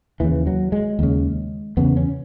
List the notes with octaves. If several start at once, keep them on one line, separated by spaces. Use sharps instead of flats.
D#2 C#3 E3
F#3
G#3
D#2 C#3
E2 C#3 B3
C#4